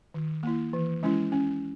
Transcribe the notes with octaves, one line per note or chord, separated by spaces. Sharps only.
D#3
A#3 E4
E3
G#3 C#4 E4
C#4